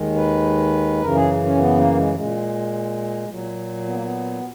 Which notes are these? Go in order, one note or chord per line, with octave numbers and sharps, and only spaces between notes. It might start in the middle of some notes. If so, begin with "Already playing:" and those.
Already playing: D#2 D#3 G#3
B4
F#2 C#3 E3 A#4
G#4
C#4
B3
A#3
G#3
A#2 G#3
A#2 F#3
B3
A#3
B3